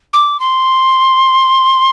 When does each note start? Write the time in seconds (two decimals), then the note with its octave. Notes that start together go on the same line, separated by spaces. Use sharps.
0.13 D6
0.40 C6